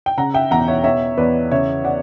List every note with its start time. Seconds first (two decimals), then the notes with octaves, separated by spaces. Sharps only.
0.06 G5
0.17 C#3 F#5 A#5
0.34 E5 G5
0.51 E2 F#5 A#5
0.68 C#5 E5
0.84 B2 C#5 E5
1.18 E2 B4 D5
1.51 C#3 C#5 E5
1.84 D5 F#5